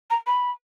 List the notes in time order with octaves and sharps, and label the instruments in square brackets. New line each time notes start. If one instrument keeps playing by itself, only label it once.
[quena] A#5
B5